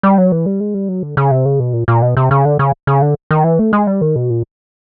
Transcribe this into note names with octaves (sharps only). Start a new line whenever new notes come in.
G3
F#3
E3
G3
G#3
G3
F#3
D3
C#3
C3
C#3
B2
A#2
A#2
B2
C3
C#3
D3
C#3
C#3
D3
D#3
E3
A3
G#3
G3
D#3
B2
A#2